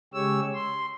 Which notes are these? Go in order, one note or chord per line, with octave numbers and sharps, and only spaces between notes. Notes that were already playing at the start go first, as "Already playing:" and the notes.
C#3 G#3 G4 C#5 E6
C6